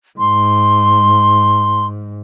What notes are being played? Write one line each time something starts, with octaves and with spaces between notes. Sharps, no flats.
G#2 C6